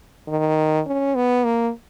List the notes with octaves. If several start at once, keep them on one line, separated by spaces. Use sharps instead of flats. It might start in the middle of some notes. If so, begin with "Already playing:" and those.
D#3
C#4
B3
A#3